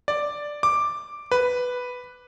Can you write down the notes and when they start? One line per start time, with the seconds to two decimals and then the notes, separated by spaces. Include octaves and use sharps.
0.08 D5
0.63 D6
1.31 B4